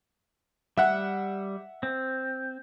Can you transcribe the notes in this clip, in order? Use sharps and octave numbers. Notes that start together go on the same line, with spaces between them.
G3 E5 F#5 F#6
C4